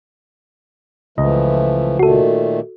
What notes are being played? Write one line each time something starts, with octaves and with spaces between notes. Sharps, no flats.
C#2 E3 F3 A3 D#5
A#2 D#3 A3 F#4 A4